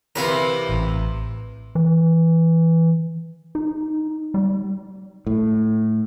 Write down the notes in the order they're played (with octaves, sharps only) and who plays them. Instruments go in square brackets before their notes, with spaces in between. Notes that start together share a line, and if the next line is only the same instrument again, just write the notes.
[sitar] C3 E3 [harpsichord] A#4 B4 F5
[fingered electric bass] A1
[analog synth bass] E3
D#4
G3
[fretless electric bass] A2